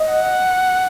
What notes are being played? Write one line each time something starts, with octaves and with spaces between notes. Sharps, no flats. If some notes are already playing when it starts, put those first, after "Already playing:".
Already playing: D#5
F#5